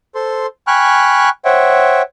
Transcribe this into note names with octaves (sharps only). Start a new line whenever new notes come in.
A4 C5 C6
G5 G#5 B5 C#6 F6 F#6
C5 C#5 E5 F#5 G5